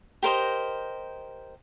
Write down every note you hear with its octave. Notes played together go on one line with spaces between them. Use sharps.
G4 A#4 C5 D#5